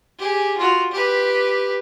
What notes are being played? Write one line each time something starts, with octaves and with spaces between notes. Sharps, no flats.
G4 G#4
F4 F#4
G4 B4